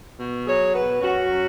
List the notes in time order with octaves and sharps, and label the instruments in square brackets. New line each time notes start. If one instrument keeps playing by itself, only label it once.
[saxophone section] B2
F#3 G#4 C#5
B2 F#4 B4
F#2 C#4 F#4
F#3